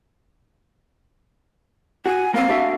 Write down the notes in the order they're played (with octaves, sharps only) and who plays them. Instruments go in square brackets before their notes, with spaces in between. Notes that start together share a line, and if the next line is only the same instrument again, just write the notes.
[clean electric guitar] F#4 [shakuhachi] G#5
[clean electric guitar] A#3 C4 [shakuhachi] F5
[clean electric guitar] D4 F#4 E5